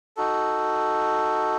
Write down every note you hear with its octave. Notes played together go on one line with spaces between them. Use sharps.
D#4 F#4 A4